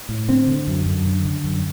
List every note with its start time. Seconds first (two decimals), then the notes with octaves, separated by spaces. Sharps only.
0.09 A2
0.28 D3 C4
0.48 D3
0.67 F#2
0.86 F#2
1.05 D3
1.25 D3
1.44 F#2